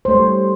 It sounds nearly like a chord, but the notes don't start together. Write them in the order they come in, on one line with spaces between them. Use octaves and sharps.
C5 A3 C#5 G3